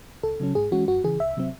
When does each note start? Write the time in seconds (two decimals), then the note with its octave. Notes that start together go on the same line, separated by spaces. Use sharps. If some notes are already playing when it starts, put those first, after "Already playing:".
0.23 C#2 A4
0.40 C#3 F#3 C#4
0.55 G#2 G#4
0.71 E3 G#3 C#4 F#4
0.88 F#2 F#4
1.04 C#3 E3 G#4
1.20 C2 E5
1.37 C3 F#3 C4